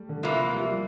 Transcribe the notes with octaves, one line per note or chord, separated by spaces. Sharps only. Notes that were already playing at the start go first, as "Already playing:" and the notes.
Already playing: G3 A3
D3
C3 E3 F3 A#3
G3
F3
G3